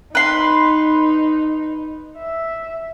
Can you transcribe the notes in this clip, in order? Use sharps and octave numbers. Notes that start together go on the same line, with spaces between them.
D#4 B4 C6
E5